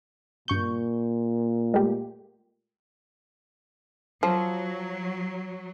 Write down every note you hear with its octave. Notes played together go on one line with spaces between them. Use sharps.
G2 A#2 C#6 G6
G#3 A3 G4
F3 F#3